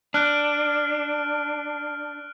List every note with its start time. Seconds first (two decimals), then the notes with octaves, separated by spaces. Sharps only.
0.14 D4 F6 F#6 D7